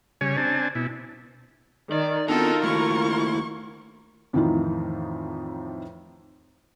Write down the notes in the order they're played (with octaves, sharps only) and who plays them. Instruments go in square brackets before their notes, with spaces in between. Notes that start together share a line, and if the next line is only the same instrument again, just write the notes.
[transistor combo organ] C#3 G3 C#5 G#5
C4 D4 G#5 A5
B2 E4
[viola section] D#3 [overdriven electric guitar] D5
[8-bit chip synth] B3 C4 D4 [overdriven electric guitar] D#4 [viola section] F4 F#4 A#4 [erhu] A4
[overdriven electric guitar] D#2 A3 [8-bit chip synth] E4 [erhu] C#6
[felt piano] F2 A2 D#3 E3 D#4 F4